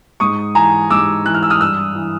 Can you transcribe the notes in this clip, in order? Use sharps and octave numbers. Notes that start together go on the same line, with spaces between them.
G#2 C#6 D#6
E3 G#5 A#5
G#2 D6 E6
E3 F#6
F6
E6
D#6 F6
G2 E6 F#6
E3